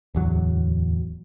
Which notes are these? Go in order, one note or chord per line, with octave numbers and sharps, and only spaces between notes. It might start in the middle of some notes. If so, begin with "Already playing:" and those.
D1 E2 F#3